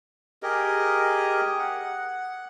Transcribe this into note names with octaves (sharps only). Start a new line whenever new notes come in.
G4 G#4 A#4 D#5
F#5